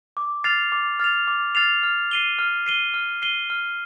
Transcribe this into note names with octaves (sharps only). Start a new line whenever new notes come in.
D6
F6 A6 C7 F7
D6
F6 A6 C7 F7
D6
F6 A6 C7 F7
F6
C7 D#7 G7
F6
C7 D#7 G7
F6
C7 D#7 G7
F6